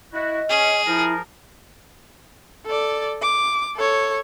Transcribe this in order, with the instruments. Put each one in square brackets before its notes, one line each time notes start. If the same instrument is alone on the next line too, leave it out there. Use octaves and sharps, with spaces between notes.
[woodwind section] E4 F#4 [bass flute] D#5
[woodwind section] C#4 [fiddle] G#4
[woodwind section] F3 A#4 [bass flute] E4
[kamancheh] A4 D5
D6
A4 C#5